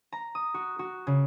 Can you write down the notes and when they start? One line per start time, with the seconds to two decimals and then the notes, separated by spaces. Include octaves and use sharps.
0.12 A#5
0.35 D#6
0.54 F#4
0.79 F#4
1.07 C#3